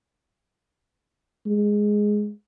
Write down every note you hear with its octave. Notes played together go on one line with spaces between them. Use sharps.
G#3